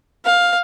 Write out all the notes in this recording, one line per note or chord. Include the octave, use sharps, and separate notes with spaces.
F5